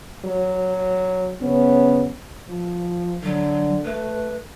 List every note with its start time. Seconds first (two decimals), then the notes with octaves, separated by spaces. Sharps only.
0.25 F#3
1.41 C#3 F#3 B3 C#4
2.49 F3
3.23 D3 F#3
3.85 A3 B4